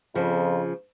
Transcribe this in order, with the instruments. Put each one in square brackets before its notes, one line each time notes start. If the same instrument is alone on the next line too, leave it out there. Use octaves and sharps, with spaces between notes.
[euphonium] F2 [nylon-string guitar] C#3 F3